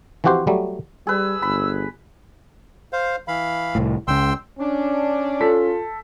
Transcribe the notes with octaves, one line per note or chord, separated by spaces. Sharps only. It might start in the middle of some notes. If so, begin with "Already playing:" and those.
E3 F3 C4 F#4 G4 C5
F#3 G3 A3
G3 G#4 B4 E6
G1 B5
C5 F5
E3 F5 B5
C2 A2
C#2 C#3 G5 C6 E6
C#4 D4
F4 A4 B6